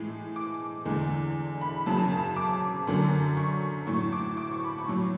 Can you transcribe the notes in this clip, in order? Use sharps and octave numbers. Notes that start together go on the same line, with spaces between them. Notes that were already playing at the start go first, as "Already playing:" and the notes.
Already playing: A2 E3 G#3
D6
E2 D3 G#3
B5
F#2 C#3 F#3 A5
A5
D6
F#2 D3 F#3
C#6
A2 F#3 C#6
D6
D6
C#6
B5
C#6
A2 F#3